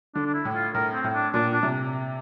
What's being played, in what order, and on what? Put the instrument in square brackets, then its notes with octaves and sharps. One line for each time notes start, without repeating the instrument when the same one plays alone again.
[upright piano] D3 [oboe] D4
[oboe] D4
E4
[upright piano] A2
[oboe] F4
[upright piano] A2 [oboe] A#4
[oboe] C4
[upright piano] A2
[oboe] D4
[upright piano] A#2 [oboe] D4
[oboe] D4
[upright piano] C3